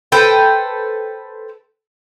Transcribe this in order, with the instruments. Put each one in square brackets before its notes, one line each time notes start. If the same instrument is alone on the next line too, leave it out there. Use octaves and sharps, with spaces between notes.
[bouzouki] A4 B4 C5 G5